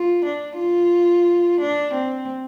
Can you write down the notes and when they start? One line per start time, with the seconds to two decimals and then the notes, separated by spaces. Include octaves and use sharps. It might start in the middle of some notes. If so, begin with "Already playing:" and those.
Already playing: F4
0.25 D4
0.59 F4
1.61 D4
1.94 C4